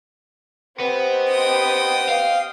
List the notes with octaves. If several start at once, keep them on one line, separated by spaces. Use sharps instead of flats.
B3 C4 G4 D#5
G5 D#6
F5